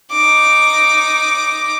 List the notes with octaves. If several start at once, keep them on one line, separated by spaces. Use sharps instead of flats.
D#4 D6